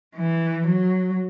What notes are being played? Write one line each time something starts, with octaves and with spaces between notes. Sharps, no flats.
E3
F#3